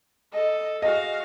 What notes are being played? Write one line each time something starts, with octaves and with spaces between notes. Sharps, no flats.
A4 D#5
F#4 G#4 D#5 F5